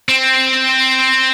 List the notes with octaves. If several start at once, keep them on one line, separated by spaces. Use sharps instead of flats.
C4